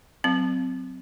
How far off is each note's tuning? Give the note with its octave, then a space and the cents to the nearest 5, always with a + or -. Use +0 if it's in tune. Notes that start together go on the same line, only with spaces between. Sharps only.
F#3 +0 C4 -20 F5 +0